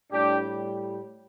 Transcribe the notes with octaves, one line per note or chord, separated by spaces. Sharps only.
A2 G3 D4 G4